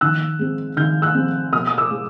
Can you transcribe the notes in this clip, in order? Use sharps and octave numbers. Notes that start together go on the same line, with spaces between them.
D#3 E6 F#6
G#3 C4
D#3 F6 G6
E6 F#6
G#3 C4
B2 D#6 F6
D#6
D6 E6
G#3